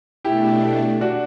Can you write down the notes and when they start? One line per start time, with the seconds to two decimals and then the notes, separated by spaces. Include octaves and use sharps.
0.25 B2 A3 D4 E4 G4
1.01 D4 F#4